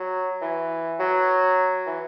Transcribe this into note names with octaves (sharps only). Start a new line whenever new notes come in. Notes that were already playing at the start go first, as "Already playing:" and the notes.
Already playing: F#3
E3
F#3
E3